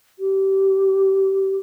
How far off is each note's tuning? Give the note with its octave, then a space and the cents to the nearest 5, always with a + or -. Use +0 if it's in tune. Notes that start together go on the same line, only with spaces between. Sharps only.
G4 -25